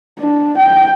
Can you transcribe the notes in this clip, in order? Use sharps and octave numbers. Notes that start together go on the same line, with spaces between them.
D4
G5